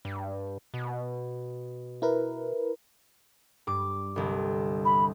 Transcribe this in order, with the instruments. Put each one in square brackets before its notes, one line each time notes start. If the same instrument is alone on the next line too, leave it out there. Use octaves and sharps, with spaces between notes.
[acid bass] G2
B2
[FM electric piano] E4 A#4 B4
[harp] G2 D6
G1 C2
[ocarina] B5